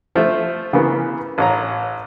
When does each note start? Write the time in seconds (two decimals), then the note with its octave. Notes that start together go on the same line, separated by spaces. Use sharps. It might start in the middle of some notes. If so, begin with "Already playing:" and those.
0.15 F3 A3
0.73 C#3 E3 A#3 B3
1.38 A1 C#5 A#5